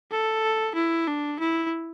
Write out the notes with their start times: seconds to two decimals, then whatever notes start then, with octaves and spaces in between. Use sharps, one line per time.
0.12 A4
0.75 E4
1.07 D4
1.40 E4